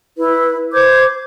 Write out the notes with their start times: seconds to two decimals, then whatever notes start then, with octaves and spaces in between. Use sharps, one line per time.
0.18 E4 B4
0.73 C5 D6 G6 G#6